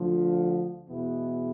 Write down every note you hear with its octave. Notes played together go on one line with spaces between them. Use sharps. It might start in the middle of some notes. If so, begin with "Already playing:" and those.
Already playing: D2 D3 F3
E2 B2 G#3 B3 E4